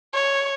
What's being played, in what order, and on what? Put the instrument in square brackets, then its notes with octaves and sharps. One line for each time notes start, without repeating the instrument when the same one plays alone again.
[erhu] C#5